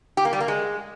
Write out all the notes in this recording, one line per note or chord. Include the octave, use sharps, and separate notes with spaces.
G4
A#3
G3
A#3
G#3